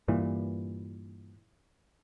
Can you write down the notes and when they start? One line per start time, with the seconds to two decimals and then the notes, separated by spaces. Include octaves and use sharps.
0.08 G2 A#2 E3